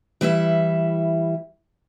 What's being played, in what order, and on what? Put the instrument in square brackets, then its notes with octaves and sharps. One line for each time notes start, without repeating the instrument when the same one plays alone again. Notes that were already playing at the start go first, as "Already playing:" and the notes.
[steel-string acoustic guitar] E3 G3 E4 E5